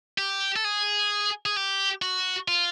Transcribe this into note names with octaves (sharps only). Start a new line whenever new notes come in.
G4
A4
G#4
G#4
G4
F#4
F4